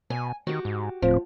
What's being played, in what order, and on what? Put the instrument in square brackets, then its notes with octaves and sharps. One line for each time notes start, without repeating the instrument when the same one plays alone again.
[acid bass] B2 [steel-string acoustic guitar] G#5
[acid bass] D#3 [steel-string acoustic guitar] F#4 G4
[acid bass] G#2
[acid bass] D1 [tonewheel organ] A2 C4 [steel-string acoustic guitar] F3